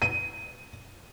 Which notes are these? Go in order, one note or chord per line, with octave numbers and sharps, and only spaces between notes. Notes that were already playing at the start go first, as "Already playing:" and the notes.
D#7